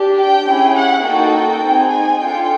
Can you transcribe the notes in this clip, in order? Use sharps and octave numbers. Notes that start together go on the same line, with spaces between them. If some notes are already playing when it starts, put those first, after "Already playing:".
Already playing: D4 G4
G5
C#4 E4 G#4
F#5
A#3 D#4 F#4 A4 G5
C4 D#4 G#4
G#5
D4 F4 A4 G5